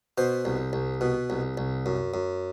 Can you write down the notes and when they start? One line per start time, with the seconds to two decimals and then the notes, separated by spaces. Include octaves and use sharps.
0.18 B2 C5
0.45 C2
0.73 C2
1.01 B2
1.30 C2
1.58 C2
1.86 F#2
2.14 F#2